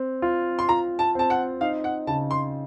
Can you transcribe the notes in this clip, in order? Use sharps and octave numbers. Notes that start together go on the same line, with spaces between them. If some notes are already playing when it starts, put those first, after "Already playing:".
Already playing: C4
F4
C6
F4 A#5
A5
C4 A5
F#5
D#4 F5
F#5
C#3 A5
C6